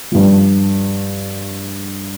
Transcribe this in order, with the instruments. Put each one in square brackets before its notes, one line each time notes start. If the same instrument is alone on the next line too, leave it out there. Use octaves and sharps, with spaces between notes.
[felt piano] G2 F3